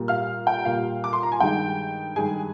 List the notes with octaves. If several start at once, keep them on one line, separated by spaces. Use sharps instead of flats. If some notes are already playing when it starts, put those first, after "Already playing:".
Already playing: A#2 G3 A#3
F5 F6
G5
A#2 G3 A#3 F5
D6
C6
A#5
G#5
G2 D#3 G#3 G5
G2 D#3 G#3 G#4 G#5